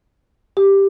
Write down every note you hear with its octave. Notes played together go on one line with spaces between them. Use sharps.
G4